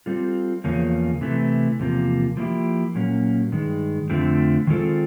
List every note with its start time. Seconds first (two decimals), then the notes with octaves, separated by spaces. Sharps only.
0.06 G3 C4 F4 A4
0.64 E2 C#3 F3 A#3 C#4
1.21 C3 E3 A3
1.80 E2 C3 F3 A#3
2.37 F3 A#3 C#4 E4 G4
2.95 A#2 F#3 A#3 C#4
3.52 G2 D#3 G#3
4.10 F2 D3 F3 A3 C4
4.67 D#3 G#3 C4 F4 A4